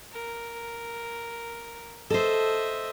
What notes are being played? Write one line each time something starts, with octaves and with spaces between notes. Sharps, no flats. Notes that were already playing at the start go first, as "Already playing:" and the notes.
A#4
A4 C5 D#5 E5